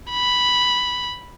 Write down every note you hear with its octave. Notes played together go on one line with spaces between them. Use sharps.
B5